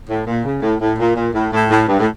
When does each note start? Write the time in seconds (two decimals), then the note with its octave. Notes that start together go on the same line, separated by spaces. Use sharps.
0.09 A2
0.27 A#2
0.45 C#3
0.63 A2
0.81 A2
0.99 A#2
1.16 A#2
1.34 A2
1.52 A2
1.70 A2
1.88 G2
1.99 A2